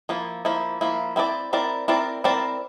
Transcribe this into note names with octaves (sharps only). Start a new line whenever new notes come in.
F3 A#3 E4
F3 A#3 E4
F3 A#3 E4
C4 E4 A#4 D5
C4 E4 A#4 D5
C4 E4 A#4 D5
C4 E4 A#4 D5